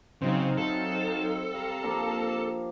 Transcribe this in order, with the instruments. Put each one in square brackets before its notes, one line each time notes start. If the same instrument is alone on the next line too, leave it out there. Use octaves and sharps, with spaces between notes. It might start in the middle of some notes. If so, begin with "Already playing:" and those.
[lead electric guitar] C#3 [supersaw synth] F#3 D#4 F5 [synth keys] C4
[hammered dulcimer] E4 C6 [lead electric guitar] A4
[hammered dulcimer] G3 [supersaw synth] F5 A#5
[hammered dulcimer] F3 A#3 D4